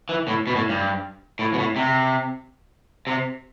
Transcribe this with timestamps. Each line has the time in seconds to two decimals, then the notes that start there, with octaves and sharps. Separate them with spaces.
0.09 E3
0.28 A2
0.47 B2
0.55 A2
0.69 G2
1.39 A2
1.53 B2
1.59 A2
1.76 C3
3.07 C3